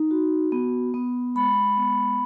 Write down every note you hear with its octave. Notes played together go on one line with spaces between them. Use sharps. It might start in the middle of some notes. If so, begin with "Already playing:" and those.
Already playing: D#4
F#4
B3
B3
G#3 B5
B3